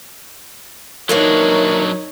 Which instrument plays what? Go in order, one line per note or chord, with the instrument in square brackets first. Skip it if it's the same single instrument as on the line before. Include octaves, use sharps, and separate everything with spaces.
[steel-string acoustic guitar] E3 A#3 A#4 [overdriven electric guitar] F#3 D4 [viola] D#4 C#5